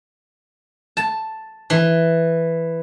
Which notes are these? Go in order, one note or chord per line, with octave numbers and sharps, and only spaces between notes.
A5
E3